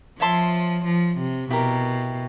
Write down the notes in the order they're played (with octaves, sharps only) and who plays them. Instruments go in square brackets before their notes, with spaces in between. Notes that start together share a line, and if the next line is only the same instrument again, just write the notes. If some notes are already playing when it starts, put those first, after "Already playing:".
[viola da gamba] F3 [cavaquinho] C#5 E5 A5 C6
[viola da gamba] F3
C3
[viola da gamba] B2 [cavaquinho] E4 G4 A#4